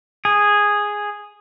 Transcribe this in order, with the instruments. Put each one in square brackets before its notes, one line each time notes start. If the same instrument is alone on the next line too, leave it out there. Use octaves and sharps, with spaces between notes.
[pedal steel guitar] G#4